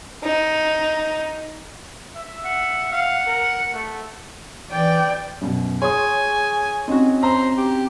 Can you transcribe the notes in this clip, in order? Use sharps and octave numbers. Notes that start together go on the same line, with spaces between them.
D#4
E5
F#5
F5 F#5
A#4
A3
E3 D5 G5
F#2 B2
G#4 C#5 G#5 C6 D#6
C4 C#4 D#4 F#4
C5 A#5
G4